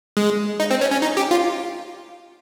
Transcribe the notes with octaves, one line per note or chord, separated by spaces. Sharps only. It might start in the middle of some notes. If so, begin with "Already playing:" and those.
G#3
D#4
C4
C#4
C#4
D#4
G4
F4